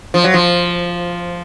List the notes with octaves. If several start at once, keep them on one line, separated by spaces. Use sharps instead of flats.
F3
F#3
F3